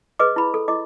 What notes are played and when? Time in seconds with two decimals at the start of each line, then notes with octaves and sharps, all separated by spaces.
0.19 G#4 B4 D#5 D6
0.36 E4 B5
0.54 A4
0.68 E4 D#5 D6